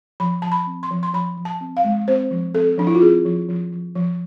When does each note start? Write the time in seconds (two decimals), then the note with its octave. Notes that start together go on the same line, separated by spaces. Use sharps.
0.20 F3 B5
0.42 F3 A5
0.52 B5
0.67 C4
0.83 C6
0.91 F3
1.03 C6
1.14 F3 B5
1.37 F3
1.45 A5
1.61 C4
1.77 F5
1.84 G#3
2.08 C4 C5
2.31 F3
2.55 C4 A4
2.78 F3 D4
2.87 E4
2.95 F4
3.02 C4 G#4
3.25 F3
3.49 F3
3.72 F3
3.95 F3